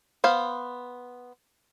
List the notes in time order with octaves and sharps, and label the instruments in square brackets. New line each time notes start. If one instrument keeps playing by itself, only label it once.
[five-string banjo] B3 C5 F5